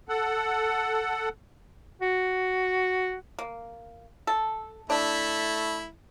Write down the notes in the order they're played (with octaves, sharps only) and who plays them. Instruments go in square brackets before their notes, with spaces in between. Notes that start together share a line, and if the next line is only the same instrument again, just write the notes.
[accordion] A4 F#5
[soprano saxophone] F#4
[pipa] A#3
A4
[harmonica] A3 E4 [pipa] D4